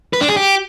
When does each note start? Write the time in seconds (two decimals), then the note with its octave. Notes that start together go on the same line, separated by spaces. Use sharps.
0.13 B4
0.21 D4
0.29 G#4
0.36 G4